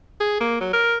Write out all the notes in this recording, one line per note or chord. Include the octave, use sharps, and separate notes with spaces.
G#4
A#3
F#3
A#4